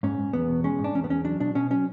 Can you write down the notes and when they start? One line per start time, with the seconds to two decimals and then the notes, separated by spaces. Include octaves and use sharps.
0.03 G#2 C#4
0.19 G#2
0.33 E2 B3
0.48 B2
0.64 G#3 C#4
0.79 G#2
0.84 D4
0.95 E2 C#4
1.04 B3
1.10 E2 C#4
1.25 F#3 D4
1.40 B2 D4
1.55 B2 C#4
1.70 F#3 C#4